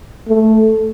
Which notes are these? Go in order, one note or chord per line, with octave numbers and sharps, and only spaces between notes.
A3